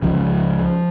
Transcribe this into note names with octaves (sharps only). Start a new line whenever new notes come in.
C#2 C#3 F3